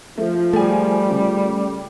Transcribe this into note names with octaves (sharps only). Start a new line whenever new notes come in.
F3 A3
G3 A3 G#4 G#5
C#3